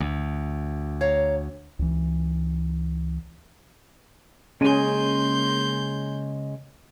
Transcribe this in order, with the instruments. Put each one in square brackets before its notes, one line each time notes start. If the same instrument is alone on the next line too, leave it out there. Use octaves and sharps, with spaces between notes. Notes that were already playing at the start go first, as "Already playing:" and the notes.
[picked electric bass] D2
[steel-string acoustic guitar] C#5 F5 A#5
[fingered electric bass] C#2 E3
[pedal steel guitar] C#3 G#3 G#5 [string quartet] A#3 C6 G6 [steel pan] C#4 G#4